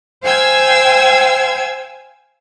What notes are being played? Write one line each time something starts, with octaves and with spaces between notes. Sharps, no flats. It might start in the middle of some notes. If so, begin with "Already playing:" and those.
C5 F5 G5 G#5 E6 G#6